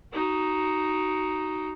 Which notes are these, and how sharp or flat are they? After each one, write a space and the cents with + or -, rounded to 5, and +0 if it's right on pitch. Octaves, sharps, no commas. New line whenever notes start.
D#4 +0 F#4 +25